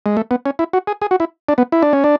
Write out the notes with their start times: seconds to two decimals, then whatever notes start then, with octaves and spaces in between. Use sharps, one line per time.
0.06 G#3
0.17 A3
0.31 B3
0.46 C#4
0.59 E4
0.73 F#4
0.87 G#4
1.02 G#4
1.11 F#4
1.20 E4
1.49 D4
1.58 B3
1.72 E4
1.83 D4
1.93 C#4
2.04 D4